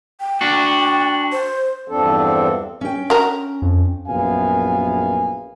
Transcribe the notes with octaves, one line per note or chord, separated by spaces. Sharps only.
G5
D4 F#4
C5
E2 G2 F3 C4 D4 A4
C#4 G5
F#4 A#4
F2
A#1 F#2 B3 F5 G#5